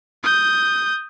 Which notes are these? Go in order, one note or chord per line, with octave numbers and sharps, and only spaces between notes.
D#6 G6